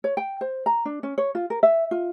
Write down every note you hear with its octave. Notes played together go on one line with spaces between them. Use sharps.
C#5
G5
C5
A#5
D4
C#4
C#5
F4
A#4
E5
F4